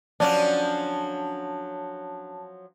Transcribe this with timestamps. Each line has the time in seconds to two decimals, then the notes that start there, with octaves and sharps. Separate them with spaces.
0.20 D3 F3 F#3 A#3 C#4 D4 F4 A5